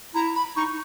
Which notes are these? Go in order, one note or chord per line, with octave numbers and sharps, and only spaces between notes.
E4 A#5
B5
D#4 C#6